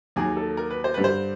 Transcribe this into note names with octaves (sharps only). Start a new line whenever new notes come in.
D#2 D#3 F#3 A#3 G#4
A4
A#4
B4
C5
G2 D3 G3 B4
C5